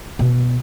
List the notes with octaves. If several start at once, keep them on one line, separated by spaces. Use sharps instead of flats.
B2